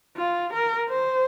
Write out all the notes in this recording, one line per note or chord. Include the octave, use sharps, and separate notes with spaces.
F4
A#4
C5